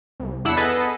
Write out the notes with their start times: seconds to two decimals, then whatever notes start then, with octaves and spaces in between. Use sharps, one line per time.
0.20 C2
0.45 E2 D4 E4 F#5 E6
0.57 B3 G#4 A4 B4 D#5